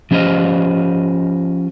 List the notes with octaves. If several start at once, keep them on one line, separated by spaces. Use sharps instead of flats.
F3 C#4 G4 C5 D#5 F5